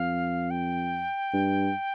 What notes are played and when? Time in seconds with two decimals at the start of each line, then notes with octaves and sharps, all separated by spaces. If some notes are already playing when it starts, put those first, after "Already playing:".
Already playing: F2 F5
0.51 G5
1.33 G2